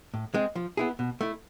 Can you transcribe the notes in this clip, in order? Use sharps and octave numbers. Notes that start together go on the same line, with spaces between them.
A2
G#3 C4 G#4
F3
B3 E4 G#4
B2
A3 E4